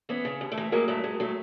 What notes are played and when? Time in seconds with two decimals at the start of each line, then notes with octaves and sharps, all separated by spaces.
0.09 E3 B3 C#4
0.25 C#3
0.41 D#2
0.52 A3
0.58 E3
0.72 F#3 G#3 A#3
0.88 G2 A3
1.04 G2 G#3
1.20 F#3 A3